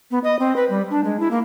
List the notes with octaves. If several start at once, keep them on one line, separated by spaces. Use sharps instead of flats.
B3
D#5
C4
B4
G3
D4
G#3
E4
A#3